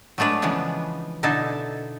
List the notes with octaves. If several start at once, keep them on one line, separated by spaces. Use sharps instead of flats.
F#3 G#3 A3 D4 B4
C#3 E3 F3 G#3 B3
B2 D3 D#4 E4 A4 A5